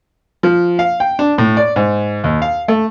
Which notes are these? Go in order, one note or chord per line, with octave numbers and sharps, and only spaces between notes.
F3
F5
G5
D4
A2
D5
G#2
D#2
F5
A3